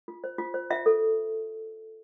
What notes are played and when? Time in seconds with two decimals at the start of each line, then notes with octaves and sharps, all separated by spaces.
0.08 F4
0.24 C5
0.38 F4
0.54 C5
0.70 F4 E5
0.86 A4